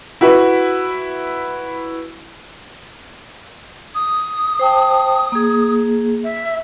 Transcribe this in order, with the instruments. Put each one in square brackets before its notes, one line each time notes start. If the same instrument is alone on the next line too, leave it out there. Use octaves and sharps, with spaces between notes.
[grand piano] E4 F#4 B4
[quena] D#6
[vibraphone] C5 G5 A5
A#3 G#4
[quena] E5